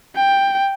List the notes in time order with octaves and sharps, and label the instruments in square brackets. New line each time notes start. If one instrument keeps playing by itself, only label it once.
[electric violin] G5